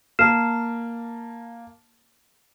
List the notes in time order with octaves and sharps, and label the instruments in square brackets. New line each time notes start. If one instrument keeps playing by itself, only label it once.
[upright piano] A#3 A5 [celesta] F6 C7 E7